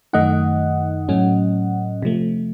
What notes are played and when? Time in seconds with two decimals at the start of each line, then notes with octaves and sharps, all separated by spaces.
0.13 F#2 D#3 A3 D#4 D#5 F#5
1.09 A2 F#3 A3 C#4
2.02 C3 F3 A3